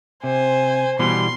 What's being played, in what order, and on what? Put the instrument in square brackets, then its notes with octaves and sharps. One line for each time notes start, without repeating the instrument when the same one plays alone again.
[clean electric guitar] C3 [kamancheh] C5 G#5
[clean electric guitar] B2 E3 G3 [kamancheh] C6